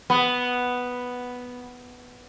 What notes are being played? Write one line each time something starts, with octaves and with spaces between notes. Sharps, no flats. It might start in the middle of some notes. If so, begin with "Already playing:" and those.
B3